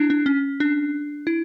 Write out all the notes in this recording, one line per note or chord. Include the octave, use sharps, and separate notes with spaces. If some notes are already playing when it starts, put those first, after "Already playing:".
Already playing: D4 E4
D4
C#4
D4
E4